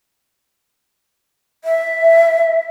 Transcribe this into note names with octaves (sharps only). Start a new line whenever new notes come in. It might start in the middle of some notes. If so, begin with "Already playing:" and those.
E5